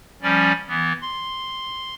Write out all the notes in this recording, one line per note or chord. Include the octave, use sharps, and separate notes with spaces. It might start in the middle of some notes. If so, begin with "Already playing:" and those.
F3 G3 C#4 D5
E3 B3
C6